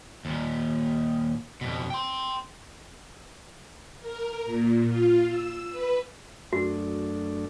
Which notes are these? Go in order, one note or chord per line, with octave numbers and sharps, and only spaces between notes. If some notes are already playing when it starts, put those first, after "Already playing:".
D#2 A#2
F2 B2
G5 C6
A#4
A#2
F4
E6
B4
F#2 A3 D4 F#4